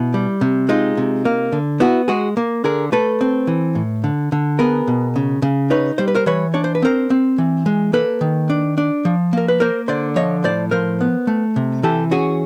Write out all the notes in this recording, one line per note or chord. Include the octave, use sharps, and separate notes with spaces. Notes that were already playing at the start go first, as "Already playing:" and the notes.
Already playing: B2 E4
G3
C3
G#3 D#4 F4
C3
A#3
D3
B3 E4 F#4
G#3 F#4 G#4
A#3
D3 G#4 A#4
A3 A4 B4
C4
E3
A2
D3
D3
B3 G#4 A#4
B2
C#3
C#3
D#4 B4 C#5
G3 C5
B4
A#4 C5
E3 B4 C#5
D4 C#5
C5
B4
C4 A#4 C5
C4
E3
G#3
A#3 A4 B4
D#3
D4
D4
F3
A#3 A#4
B4
A#3 A#4 C5
D3 C5 D5
F3 C#5 D#5
A2 C5 D5
F3 A#4 C5
B3
A3
C3
E3 G4 A4
C#4 F#4 G#4